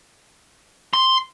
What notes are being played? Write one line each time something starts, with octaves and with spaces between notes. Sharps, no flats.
C6